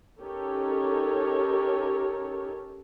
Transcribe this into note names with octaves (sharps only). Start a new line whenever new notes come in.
C#4 D#4 G4 A4 A#4 C#5